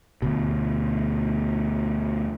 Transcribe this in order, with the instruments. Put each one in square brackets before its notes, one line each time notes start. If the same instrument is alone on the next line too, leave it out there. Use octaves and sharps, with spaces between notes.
[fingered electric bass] D2 B2